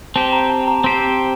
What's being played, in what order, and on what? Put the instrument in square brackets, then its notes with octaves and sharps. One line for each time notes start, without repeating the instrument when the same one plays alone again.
[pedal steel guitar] C4 G4 C5 [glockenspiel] A5
[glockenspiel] A#5
A5
A#5
[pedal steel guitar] C4 G4 C5 [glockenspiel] C6